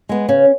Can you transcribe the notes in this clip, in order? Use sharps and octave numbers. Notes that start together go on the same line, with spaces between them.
G#3 B3
C#3 C#4